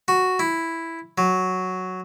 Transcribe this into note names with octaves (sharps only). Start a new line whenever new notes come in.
F#4
E4
F#3